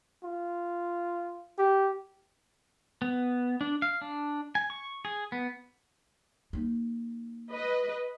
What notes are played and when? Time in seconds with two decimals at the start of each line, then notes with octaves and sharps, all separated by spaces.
0.24 F4
1.58 G4
3.02 B3
3.61 D4
3.82 F5
4.02 D4
4.55 G#5
4.70 C#6
5.05 G#4
5.32 B3
6.53 A#3 D#4
7.51 B4 D#5